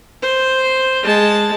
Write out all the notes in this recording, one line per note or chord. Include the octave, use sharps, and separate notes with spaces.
C5
G#3 A5